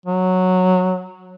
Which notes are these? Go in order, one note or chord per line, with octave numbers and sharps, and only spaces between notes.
F#3